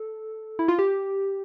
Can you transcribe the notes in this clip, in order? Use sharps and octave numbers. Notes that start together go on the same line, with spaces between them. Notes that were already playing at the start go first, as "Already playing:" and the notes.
Already playing: A4
E4
F4
G4